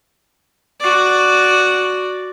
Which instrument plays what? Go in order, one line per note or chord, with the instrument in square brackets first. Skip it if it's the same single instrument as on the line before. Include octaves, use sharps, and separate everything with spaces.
[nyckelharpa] F#4 D5